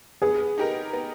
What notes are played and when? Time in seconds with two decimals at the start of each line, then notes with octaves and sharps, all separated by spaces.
0.22 B3 G#4
0.58 D#4 G4 A#4
0.93 B3